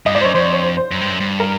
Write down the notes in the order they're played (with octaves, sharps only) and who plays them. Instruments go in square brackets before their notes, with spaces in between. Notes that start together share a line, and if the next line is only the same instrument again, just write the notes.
[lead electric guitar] G2 [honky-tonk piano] D#5
[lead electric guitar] G#2 [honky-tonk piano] D5
[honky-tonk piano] C5
[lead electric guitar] F#2 [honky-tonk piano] C#5
[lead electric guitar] F2 [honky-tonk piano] C5
[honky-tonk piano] C#5
C5
C5
[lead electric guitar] F#2
G2
F#2
G2
[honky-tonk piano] A#4